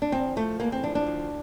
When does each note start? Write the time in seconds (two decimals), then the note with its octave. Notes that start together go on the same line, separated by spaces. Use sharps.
0.02 D4
0.12 E2 C4
0.36 F3 A3
0.60 E2 A#3
0.72 C4
0.84 F3 D4
0.95 D4
1.07 D2